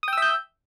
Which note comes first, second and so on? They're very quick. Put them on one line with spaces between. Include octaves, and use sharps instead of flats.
D#6 G5 E6 E5 G6